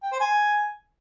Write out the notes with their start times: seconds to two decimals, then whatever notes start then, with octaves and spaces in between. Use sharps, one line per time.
0.03 G5
0.12 C5
0.20 G#5